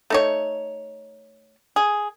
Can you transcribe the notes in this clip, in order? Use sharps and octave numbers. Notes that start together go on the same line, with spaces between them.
A3 D#4 C#5
G#4